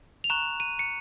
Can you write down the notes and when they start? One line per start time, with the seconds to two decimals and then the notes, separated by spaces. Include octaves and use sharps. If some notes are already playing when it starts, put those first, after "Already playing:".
0.24 F7
0.30 A#5 C#6 F#6 E7
0.60 D#7
0.79 C#7